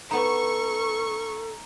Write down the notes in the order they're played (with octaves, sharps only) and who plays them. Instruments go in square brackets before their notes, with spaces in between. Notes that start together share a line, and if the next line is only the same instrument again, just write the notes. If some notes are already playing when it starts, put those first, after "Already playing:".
[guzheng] B3 D#4 [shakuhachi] A4 [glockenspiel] A#5 [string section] C#6